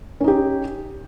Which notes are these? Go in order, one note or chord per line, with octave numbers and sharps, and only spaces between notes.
C#4 D#4 G4